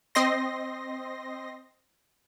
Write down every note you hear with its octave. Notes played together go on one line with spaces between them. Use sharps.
C4 D#5 C6 A#6